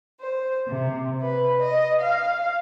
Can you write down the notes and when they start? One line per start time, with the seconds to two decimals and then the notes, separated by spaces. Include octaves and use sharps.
0.21 C5
0.68 C3
1.22 B4
1.61 D#5
2.00 F5